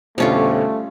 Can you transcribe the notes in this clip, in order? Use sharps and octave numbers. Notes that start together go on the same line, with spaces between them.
F2 B2 D3 G3 A3 C#4 F4